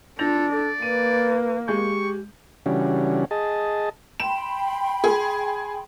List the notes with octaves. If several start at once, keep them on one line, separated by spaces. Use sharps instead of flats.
D4 F4 A4 G6 A#6 F7
A4 D5
A#3 B4 D#7
G#3 G4 C#6 G6
C#3 E3 G3 C#4 D4 F#4
G#4 D#5 A5
G5 B5 C6 E7
G#4